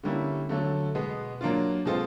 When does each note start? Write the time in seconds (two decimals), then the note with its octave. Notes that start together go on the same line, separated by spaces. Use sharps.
0.04 D3 G3 A#3 C#4 E4
0.49 D3 F#3 A3
0.95 B2 G#3 B3
1.41 F#3 A#3 D4 F4
1.85 B2 G#3 C4 F4 A4